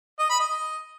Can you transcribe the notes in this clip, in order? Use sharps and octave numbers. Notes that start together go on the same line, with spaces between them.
D#5
B5
D#5